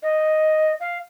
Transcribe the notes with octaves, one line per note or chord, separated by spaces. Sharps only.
D#5
F5